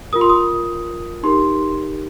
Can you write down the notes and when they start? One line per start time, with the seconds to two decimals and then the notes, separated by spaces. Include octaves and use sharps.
0.13 F4 A#4 D#6
0.21 C6
0.29 D#6
1.23 D#4 G4 A#4 C6